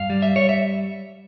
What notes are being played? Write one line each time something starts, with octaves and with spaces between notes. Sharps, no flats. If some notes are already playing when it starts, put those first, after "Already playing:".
Already playing: G2 F5
G3
E5
G3 C#5
E5